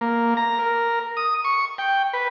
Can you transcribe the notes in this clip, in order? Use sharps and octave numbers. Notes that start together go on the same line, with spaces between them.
A#3
A#5
A#4
D#6
C#6
G5
B4